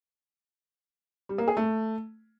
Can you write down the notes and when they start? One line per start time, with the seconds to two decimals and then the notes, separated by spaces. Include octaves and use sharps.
1.29 G3
1.38 A#3
1.48 G#4
1.57 A3